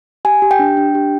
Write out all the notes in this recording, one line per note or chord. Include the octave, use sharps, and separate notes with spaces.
G4 G#5
G4
G5
D4
D4
G4